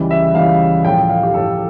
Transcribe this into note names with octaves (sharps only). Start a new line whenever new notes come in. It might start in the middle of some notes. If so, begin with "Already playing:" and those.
Already playing: C#2 C#3 E3 G3
E5
C#2 C#3 E3 G3 F5
A2 F3 G5
F5
G4
A2 F3 A4